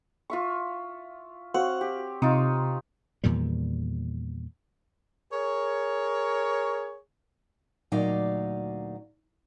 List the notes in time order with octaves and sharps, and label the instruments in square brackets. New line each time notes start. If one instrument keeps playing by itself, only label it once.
[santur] F4 E5 C#6
[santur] C4 C#5 F#5 [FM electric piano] F#4 F5
[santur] G4
[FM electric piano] C3 [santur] D#4 F4
[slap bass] E2 A#2 D#3 G3
[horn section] G#4 A#4 C#5
[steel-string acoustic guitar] D2 A#2 F#3 D#4 D5 F5